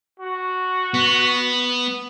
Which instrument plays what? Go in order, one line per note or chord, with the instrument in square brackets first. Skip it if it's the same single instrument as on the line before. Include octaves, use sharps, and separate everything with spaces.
[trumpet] F#4
[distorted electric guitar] B3